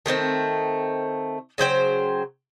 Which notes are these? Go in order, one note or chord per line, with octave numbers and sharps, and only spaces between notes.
D#3 A3 A#3 C4
C#3 F#3 C5 G5